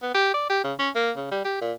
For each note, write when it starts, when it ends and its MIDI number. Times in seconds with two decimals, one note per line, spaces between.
0.02 0.11 59
0.14 0.32 67
0.34 0.47 74
0.49 0.61 67
0.64 0.74 49
0.79 0.90 61
0.95 1.11 58
1.17 1.27 49
1.31 1.42 55
1.44 1.57 67
1.61 1.73 46